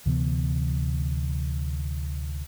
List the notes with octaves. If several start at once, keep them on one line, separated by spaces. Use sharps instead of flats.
D2 C3 E3 B3